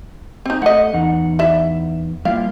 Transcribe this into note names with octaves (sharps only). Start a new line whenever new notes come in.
C4 D#4
A3 E4 D#5 F#5
E2 D#4 F#5
E4 D5 E5
G3 A#3 E4 F4 F5